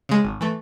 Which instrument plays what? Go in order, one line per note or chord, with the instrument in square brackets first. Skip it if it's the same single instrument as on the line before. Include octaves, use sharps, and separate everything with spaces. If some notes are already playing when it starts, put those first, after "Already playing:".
[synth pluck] C#3 G#3
G#1
E3 A3